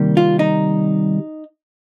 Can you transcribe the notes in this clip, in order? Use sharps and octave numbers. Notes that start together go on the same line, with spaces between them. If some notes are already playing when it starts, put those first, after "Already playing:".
Already playing: C3 D#3 G3 A#3
F4
D#4